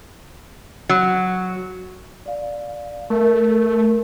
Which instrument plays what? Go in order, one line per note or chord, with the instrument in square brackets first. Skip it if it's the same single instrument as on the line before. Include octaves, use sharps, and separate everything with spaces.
[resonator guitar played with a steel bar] F#3
[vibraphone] D5 F5
[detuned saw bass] A3 [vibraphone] A#4